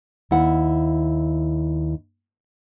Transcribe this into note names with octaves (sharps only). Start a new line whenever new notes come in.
D#2 E4 F#5